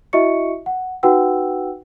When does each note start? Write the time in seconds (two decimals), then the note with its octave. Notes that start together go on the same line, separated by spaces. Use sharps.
0.13 E4 F#4 D#5 E5 C#6 C#7
0.66 F#5
1.03 D#4 F#4 B4 F#5 G5 E6